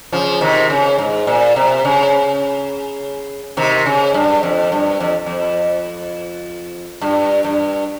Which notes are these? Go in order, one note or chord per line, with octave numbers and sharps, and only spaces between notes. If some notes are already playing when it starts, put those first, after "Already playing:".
C#3 F3
C3 D#3
C#3
G#2
A#2
C3
C#3
C3 D#3
C#3
G2
F2
G2
F2
F2
G2
G2